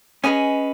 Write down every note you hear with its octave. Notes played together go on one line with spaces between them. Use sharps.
C#4 G#4 B4 D#5 G#5